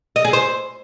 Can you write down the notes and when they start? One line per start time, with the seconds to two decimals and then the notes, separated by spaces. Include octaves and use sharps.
0.16 D#5
0.25 G#4
0.33 C5